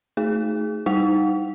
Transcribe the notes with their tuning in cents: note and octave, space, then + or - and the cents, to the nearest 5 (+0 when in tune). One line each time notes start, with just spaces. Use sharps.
A3 +0 D#4 +15 G#4 +0
G3 +0 D#4 -5 G5 -45